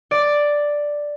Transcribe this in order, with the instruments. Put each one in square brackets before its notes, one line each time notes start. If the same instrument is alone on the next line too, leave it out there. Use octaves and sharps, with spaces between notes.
[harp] D5